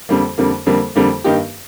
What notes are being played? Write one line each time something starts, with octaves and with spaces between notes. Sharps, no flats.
F2 D3 G3 A#3
F2 D3 G3 A#3
F2 D3 G3 A#3
F2 D3 G3 A#3
G2 D#3 A#3 D#4 G4